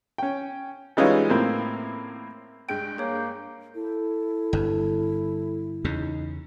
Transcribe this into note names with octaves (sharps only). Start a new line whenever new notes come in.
C#4 G5
E3 G3 G#3 C#4 D#4 F4
A2 A#3 C4
G2 G#3 G5 G6 D7
A#3 G#4 C#5
E4 A4
G1 G2
E2 C#3 D#4